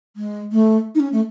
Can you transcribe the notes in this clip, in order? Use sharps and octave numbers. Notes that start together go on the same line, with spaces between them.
G#3
A3
D#4
C#4
A3